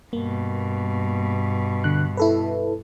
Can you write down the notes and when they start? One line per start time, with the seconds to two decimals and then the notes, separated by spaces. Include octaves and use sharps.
0.13 G2 B2 A#3
1.84 D3 F#6
2.17 E4 A4 B4